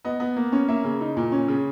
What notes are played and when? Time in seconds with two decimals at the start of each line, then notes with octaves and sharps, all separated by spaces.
0.05 B3 D#5
0.20 B3
0.36 A#3
0.52 C#4
0.68 A#3 E5
0.84 C#3
1.01 D#4
1.17 A#2
1.32 C#4
1.48 C#3